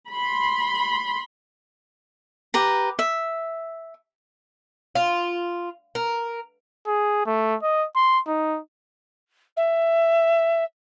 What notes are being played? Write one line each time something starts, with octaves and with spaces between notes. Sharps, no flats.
B5 C6
G4 B4 A#5
E5
F4
A#4
G#4
A3
D#5
C6
D#4
E5